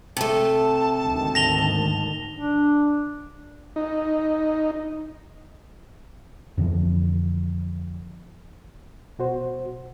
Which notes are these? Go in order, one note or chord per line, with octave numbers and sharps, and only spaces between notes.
C3 A3 A5
D2 G#2 D#3
A#6 F7 G7
D4
D#4
F2 D3 E3 F3
B2 F#4 C5